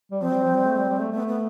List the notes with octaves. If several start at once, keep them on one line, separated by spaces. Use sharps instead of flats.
G3
F3 C4
G3
F3
G3
A3
G3
G3
A3
A3 B3
B3